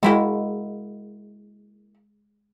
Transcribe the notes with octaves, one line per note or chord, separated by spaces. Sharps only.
G#3 A#3 E4 F#4